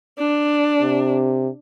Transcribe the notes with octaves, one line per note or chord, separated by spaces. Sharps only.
D4
C3